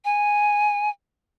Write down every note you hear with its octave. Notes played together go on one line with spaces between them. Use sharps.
G#5